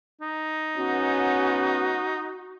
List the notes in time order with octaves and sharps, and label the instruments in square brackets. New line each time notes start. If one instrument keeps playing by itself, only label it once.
[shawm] D#4
[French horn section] G#2 B3 C#4 [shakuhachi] F#4